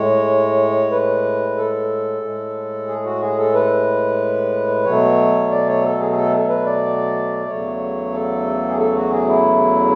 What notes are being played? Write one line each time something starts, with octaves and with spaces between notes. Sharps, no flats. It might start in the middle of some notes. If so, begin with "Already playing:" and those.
Already playing: A2 G#3 C#5
B4
A4
A2 G#3
G#4
F#4
G#4
A4
B4
B2 F#3 A3 C#5
D5
C#5
A4
G#4
G#4
A4
B4
D5
E2 C#3 F#3 A3 C#5
A4
G#4
A4
F#4
G#4
E4